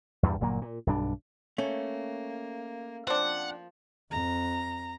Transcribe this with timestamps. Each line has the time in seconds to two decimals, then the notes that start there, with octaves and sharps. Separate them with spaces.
0.23 E2 G2 A#2 G3
0.41 G1 A#2 F#3 A#3
0.62 A#2
0.87 B1 G2 D4
1.58 A3 A#3 C#4
3.07 F3 C4 D4 F#5
4.11 F2 A#5